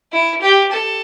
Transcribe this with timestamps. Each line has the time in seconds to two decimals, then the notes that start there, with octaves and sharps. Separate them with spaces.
0.12 E4
0.42 G4
0.72 A4